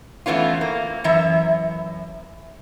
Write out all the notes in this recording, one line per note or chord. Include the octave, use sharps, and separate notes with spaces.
E3 A3 B3 C#4 F4
A#3
F#2 E3 E5